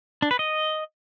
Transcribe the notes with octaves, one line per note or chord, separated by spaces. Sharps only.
D4
B4
D#5